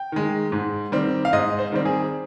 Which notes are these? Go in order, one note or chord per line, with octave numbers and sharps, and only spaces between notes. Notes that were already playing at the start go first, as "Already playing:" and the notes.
Already playing: G5
D#3 G#3
G#2
D#3 G3 C4
F5
G#2 D#5
C5
D#3 G3 C4
G#4